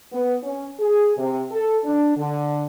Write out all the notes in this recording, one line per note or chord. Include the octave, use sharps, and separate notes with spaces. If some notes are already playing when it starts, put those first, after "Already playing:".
B3
C#4
G#4
C3
A4
D4
D3